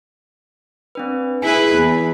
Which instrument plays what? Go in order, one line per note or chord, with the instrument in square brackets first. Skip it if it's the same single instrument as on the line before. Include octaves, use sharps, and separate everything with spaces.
[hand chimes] C4 D4 B4
[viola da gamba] E4 G#4 B4 [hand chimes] G#5 B6
[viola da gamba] E2